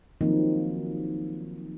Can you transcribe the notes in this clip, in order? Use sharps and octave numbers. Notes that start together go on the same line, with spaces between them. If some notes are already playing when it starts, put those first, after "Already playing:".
D#3 F3 F#3 A#3 C4 D#4